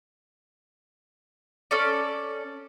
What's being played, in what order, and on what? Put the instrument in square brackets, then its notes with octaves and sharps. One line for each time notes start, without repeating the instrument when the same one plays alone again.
[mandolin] C#4 A4 D5